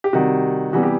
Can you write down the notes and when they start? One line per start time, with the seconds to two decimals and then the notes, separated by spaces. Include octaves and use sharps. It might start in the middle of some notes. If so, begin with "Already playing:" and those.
0.04 G4
0.13 C3 D#3 G3 F#4
0.73 C3 E3 G3 B3 F#4
0.83 G4